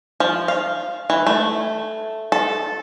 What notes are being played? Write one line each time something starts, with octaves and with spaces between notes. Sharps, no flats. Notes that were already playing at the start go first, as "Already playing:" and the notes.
F3
F5
E3
A3
A4